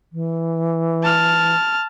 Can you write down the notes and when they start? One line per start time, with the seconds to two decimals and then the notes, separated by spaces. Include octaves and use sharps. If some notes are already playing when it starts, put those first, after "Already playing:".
0.12 E3
1.03 A5 F6